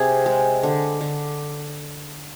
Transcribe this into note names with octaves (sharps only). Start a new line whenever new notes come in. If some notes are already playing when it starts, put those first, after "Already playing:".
Already playing: C3 G#4
G#3
D3
D3